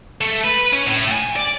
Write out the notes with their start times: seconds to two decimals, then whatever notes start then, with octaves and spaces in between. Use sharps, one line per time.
0.21 A3
0.44 B4
0.73 C#4
0.87 A2
1.12 G#5
1.37 D5